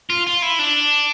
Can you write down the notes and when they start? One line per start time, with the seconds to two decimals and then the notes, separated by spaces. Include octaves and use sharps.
0.10 F4
0.27 F4
0.42 E4
0.59 D4